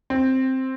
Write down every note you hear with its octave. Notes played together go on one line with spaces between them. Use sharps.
C4